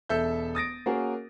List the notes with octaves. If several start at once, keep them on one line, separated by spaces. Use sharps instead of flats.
E1 A4 E5 G6
D#6 A6 A#6 D7
A#3 C#4 F#4 G#4 A#4